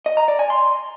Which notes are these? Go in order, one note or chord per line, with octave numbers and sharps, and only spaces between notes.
D#5
A#5
D5
G#5
C6